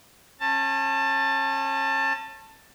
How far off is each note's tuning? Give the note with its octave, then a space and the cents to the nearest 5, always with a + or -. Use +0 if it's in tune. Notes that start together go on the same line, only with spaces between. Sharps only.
C#4 -30 A5 +15